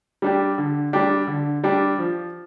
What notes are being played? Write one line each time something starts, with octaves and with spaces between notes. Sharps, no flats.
G3 D4 G4
D3
G3 D4 G4
D3
G3 D4 G4
F3